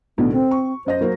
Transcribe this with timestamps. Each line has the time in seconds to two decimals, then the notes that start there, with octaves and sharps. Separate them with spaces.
0.18 B1 A2 D3 B3
0.32 C4 A4
0.51 C#6
0.86 F#2 C5 D#5 A#6
1.01 F#3 A#3 F#4